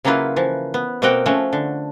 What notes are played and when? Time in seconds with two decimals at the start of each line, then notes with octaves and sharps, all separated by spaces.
0.05 C#3 F#3 A#3 E4 F4 B4
0.36 E3 F3
0.74 B3
1.02 B2 A#3 C4 A#4 F#5 G5
1.26 F3 A3 C#4 F#4
1.53 D3